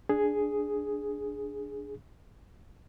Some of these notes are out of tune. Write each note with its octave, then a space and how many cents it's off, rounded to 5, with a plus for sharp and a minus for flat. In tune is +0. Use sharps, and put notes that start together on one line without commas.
D4 +0 G#4 +0